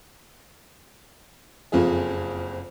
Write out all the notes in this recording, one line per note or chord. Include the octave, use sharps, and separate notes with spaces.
F#1 F2 F4 G#4